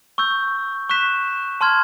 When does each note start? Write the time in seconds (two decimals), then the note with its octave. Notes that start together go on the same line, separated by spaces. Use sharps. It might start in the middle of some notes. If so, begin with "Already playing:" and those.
0.18 C#6 E6 G6
0.90 C#6 F#6 B6 E7
1.61 A5 C6 F6 G#6